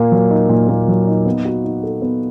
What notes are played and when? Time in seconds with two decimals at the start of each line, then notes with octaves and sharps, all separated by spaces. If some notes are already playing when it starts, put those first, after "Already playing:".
Already playing: A#2 A#3
0.12 F#3
0.30 D#4
0.49 A#2
0.69 A#3
0.88 F#3
1.07 D#4
1.26 B3
1.45 F#4
1.64 D#4
1.83 A4
2.02 B3